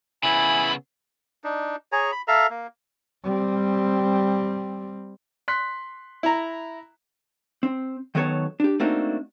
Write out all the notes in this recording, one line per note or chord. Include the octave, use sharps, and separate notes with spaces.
C#3 B3 E4 G#5 B5
D4 D#4
G#4 C#5 G#5 A#5
B5
A4 E5 F5 A#5
A#3
G3 C4
C6 F#6 B6
E4 A#5
C4
D#3 F#3 B3 A4 C#5
D4 G4
A3 A#3 C4 D4 D#4 F#4